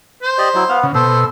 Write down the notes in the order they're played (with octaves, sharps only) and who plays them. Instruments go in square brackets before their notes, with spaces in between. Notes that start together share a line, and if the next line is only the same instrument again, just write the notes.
[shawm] C5
[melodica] G4 D5 D#5
F#3 E4
[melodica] B3 [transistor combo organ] F5
[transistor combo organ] C#3
[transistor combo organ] B2 [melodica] A4 [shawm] C5